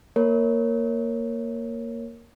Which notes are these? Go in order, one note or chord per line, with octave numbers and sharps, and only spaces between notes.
A#3 A#4 C#5